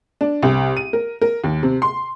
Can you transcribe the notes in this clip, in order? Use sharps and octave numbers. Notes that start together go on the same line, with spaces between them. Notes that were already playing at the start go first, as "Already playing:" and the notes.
D4
C2
D#7
A#4
A#4
D#2
C3
C6